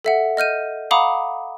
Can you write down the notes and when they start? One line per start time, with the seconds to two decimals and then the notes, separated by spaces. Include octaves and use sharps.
0.04 A4 E5 F#5
0.37 D#5 F6 G6 D#7
0.91 F5 F#5 A#5 B5 D6 D#6